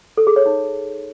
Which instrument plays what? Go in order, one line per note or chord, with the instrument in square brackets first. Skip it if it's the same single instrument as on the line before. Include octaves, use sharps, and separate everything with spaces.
[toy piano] A4
G#4
C#5
D#4